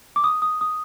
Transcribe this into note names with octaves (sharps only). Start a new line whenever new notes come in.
D6
D#6
D#6
D#6